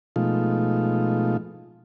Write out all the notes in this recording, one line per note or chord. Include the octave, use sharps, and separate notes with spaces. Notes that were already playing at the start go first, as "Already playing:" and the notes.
B2 F3 G#3 A3 D#4 F4